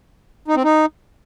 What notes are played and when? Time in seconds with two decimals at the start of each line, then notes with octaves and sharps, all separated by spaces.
0.48 D#4
0.56 C4
0.64 D#4